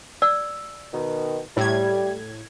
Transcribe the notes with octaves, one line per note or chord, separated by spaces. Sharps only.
D5 E6
B2 D#3
A2 G3 E4 G#6